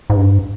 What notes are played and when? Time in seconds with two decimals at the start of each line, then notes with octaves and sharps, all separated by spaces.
0.10 G#2
0.17 G2